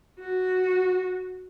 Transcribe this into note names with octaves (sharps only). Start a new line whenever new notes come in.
F#4